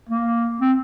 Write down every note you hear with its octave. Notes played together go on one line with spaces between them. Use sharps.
A#3
C4